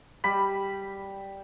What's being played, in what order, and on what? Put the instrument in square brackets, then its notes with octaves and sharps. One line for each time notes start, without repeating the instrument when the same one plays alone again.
[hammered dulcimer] G3 B5